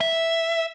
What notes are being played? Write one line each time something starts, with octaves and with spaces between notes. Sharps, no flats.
E5